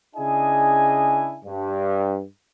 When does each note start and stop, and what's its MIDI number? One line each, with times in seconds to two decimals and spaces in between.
0.16 1.37 49
0.16 1.37 62
0.16 1.37 64
0.16 1.37 68
0.16 1.37 75
0.16 1.37 80
1.45 2.22 43